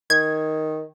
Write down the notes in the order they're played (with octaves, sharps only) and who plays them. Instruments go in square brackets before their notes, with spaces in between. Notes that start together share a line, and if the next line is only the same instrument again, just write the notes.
[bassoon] D#3 [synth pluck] G#6